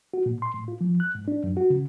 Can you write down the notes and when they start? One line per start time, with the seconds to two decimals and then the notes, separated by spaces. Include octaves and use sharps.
0.14 F#4
0.26 A#2
0.42 C6
0.54 A2
0.68 F4
0.81 F3
1.00 F#6
1.15 G#2
1.28 D4
1.44 F#2
1.57 F#4
1.70 C#3